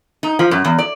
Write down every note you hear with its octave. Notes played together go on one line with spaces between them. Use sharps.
D#4
F3
F#2
E2
D5